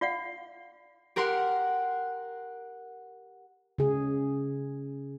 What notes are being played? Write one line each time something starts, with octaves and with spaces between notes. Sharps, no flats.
F4 D5 F5 F#5
G4 A#4 F#5 C6
C#3 G#4